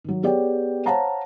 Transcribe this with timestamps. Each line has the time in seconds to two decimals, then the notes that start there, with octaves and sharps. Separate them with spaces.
0.04 D#3 F#3
0.23 B3 G4 G#4 C#5 D5 G5
0.86 C5 C#5 F5 F#5 A5 A#5